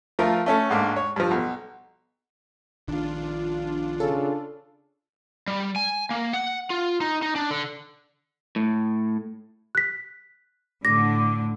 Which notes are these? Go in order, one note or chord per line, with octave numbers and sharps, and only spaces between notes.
F3 A3 F4 A#4
A3 C#4 A4
C#2 G#2 A#3 D4
C#5
G2 F3
B1
A#1 D#3 D4 F4
C#3 A4
G3
G#5
A#3
F#5
F4
D#4
D#4
D4
D3
A2
F#6 B6
A2 D3 D6 A#6